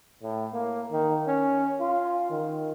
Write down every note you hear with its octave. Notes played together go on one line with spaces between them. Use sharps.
A2
A#3
D#3
C#4
F4
D#3